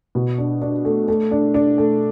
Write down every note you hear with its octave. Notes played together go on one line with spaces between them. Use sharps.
B2
D4
D4
A3
A3
D4
D4
A3